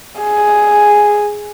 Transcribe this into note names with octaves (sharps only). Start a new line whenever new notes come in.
G#4